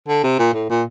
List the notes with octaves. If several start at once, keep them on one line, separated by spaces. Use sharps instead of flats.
D3
C3
A#2
A2
A#2